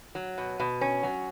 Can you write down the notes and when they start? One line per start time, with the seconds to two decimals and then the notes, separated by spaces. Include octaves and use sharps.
0.15 F#3
0.38 B2
0.60 B2
0.81 C#4
1.03 F#3